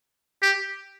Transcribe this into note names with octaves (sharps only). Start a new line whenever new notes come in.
G4